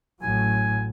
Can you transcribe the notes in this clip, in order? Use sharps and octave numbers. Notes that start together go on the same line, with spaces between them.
A1 A2 F#3 G#5